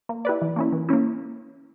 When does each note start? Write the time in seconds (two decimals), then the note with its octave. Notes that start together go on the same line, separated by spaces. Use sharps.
0.09 A#3
0.25 E4 G4 B4 D5
0.42 E3
0.56 A#3 C#4 E4
0.72 E3
0.89 A#3 C#4 E4